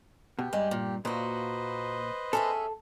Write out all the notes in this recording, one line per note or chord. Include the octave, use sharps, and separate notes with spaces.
B2 G4
G2 G3 G#3
A#2
A#2 A#3 F#4 B4 C5 D#5
C#4 G#4 A4 E5